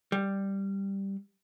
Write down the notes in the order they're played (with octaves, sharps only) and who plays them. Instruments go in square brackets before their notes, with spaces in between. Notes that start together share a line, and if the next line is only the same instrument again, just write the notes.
[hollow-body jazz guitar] G3